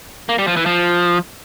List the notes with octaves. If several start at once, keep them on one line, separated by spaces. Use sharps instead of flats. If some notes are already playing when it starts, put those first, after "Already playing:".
A#3
G3
F3
E3
F3